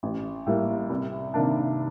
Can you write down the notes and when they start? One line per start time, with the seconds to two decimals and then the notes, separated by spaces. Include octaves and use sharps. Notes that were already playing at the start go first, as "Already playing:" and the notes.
0.03 A1
0.47 A2 G3 A#3
0.90 C2
1.34 C3 D#3 A#3 D4